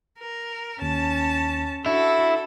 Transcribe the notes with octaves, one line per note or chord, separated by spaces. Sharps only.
A#4
D#2 C#4 A5
D4 E4 F#4 A4